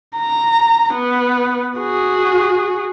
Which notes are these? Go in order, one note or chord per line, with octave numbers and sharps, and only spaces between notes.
A#5
B3
F#4 G#4